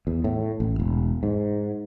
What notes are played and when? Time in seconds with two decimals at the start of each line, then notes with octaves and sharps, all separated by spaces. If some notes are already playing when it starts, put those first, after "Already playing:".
0.07 E2
0.24 A2
0.60 A1
0.80 E1
1.23 G#2